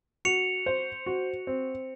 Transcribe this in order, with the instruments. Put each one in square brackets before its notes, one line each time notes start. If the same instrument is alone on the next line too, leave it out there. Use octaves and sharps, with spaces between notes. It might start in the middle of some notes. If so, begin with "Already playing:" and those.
[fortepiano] F#4 [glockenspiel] C#7 F7
[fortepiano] C5
F#4
C4